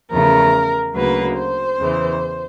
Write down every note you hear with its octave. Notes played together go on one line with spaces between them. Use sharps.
E2 C#3 F3 A3 A#4
D2 C#3 F#3 A#3 B4
C5
E2 C#3 E3